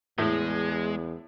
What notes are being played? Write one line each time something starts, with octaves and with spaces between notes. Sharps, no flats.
E2 A2 G#3